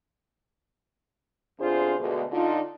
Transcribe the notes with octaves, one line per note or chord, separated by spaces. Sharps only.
E2 C3 D4 F4 G#4 C5
D2 B2 G#3
D3 D4 D#4 F4